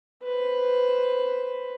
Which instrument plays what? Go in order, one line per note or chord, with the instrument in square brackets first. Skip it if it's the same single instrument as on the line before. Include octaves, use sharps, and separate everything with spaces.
[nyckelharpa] B4 C5